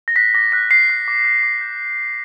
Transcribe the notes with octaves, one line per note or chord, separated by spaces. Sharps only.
A#6
F#6 B6
D6 A#6
F#6 B6
D6 C7
F#6
D6
F#6
D6
G6